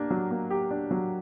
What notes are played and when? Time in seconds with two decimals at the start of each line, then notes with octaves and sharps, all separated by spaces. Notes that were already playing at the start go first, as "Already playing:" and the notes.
Already playing: A#3 D4 G4
0.10 F#3
0.31 A#3
0.50 G4
0.71 D4
0.91 F#3